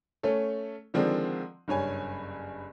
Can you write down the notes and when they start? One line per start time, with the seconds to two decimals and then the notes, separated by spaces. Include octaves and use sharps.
0.23 A3 C#4 A4 C#5
0.94 D3 D#3 F3 G#3 C4 D4
1.68 F#1 G2 C#5 G#5